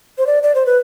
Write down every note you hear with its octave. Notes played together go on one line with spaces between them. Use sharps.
C5
D5
D5
C5
B4